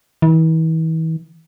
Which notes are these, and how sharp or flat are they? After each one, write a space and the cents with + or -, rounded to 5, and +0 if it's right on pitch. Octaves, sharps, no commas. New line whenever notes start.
E3 -40